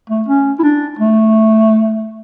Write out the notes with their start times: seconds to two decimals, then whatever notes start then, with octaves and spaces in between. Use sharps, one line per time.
0.10 A3
0.28 C#4
0.59 E4
0.63 D4
0.99 A3